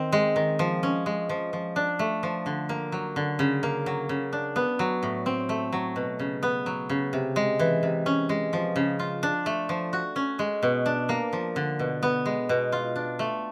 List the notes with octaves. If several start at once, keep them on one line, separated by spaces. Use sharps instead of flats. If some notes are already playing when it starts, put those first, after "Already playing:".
Already playing: D#3 C4
G#3
D#3
F3
C#4
G#3
F3
F3
D4
A3
F3
D3
A#3
F#3
D3
C#3
A#3
F#3
C#3
D4
B3
F#3
A2
C4
A3
F#3
B2
C#3
B3
F#3
C#3
C3
G#3
E3
C3
C#4
G#3
F3
C#3
F4
D4
A3
F3
F#4
C#4
G#3
B2
D4
A#3
F3
D3
B2
B3
G#3
B2
F4
D4
A3